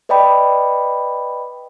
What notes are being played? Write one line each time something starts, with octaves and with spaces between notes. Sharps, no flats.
B4 D5 D#5 G5 B5